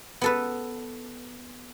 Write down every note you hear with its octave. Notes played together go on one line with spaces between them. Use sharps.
B3 A4 B4